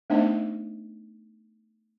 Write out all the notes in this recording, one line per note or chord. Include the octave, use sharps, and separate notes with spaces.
A3 B3 D4 D#4 C5 D#5